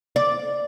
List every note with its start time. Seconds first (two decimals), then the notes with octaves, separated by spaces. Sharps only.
0.16 D5